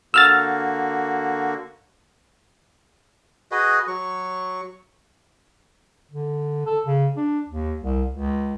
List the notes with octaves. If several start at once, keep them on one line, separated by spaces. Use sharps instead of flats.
D3 A#3 F#4 E6 F6 A6
F#4 G#4 B4 D#5
F#3 C#6
D3
A4
C#3
D4
D#2
C2
C#2